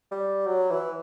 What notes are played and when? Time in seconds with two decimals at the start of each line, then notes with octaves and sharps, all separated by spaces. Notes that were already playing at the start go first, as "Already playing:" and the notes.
0.11 G3
0.46 F#3
0.71 E3